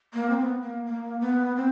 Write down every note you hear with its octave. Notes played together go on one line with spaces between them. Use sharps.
A#3
C4
B3
A#3
A#3
B3
C4